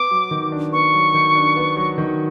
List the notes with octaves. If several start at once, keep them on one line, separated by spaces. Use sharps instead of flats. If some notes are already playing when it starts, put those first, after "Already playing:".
Already playing: B3 D6
F#3
D#3
D4
B3 C#6
F#3
D#3
D4
B3
F#3
D#3